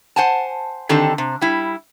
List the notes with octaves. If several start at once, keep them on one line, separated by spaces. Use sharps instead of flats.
C5 F#5 G#5 A5
D3 D#3 C4 G4 A4
C3
G3 E4